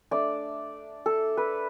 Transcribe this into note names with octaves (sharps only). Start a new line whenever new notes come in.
A3 D4 D5
A4
B4